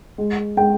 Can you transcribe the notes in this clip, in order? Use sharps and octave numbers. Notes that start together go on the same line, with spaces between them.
G#3
G#3 G5